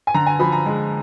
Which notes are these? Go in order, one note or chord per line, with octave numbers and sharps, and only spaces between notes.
G#5
D3 A#5
G#5
F3 B5
A#5
G#3